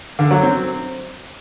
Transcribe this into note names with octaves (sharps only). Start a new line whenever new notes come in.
D3
F#3
C4